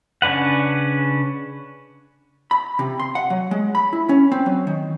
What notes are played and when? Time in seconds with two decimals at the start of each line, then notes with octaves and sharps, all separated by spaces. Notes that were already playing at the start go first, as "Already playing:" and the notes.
0.22 C#3 C#4 D4 B4 F#5
2.51 B5
2.79 C3
3.00 C6
3.15 F#5
3.30 F#3
3.51 G#3
3.75 B5
3.93 E4
4.09 C#4
4.32 C4
4.46 F#3
4.67 D#3